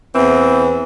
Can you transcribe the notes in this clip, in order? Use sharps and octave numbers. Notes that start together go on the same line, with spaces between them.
E2 E3 C4